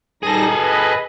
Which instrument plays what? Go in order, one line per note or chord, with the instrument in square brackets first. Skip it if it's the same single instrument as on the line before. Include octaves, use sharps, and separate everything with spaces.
[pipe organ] G3 D#4 A#6 [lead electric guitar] G#4 A4
[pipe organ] B4 D#5